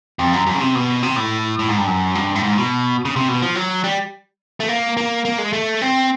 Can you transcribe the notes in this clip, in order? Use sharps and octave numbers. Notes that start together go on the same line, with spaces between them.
F2
F#2
F#2
C#3
C3
B2
C3
A2
A2
G#2
G2
F#2
G2
A2
G#2
B2
C#3
C3
B2
F3
F#3
G3
A3
A#3
A#3
A#3
G#3
A3
C4